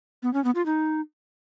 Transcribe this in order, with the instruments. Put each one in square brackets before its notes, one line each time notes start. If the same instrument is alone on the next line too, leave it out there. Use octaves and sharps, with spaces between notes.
[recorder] B3
C#4
B3
F4
D#4